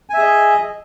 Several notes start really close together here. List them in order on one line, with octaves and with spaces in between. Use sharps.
G#5 E5 G#4 D#5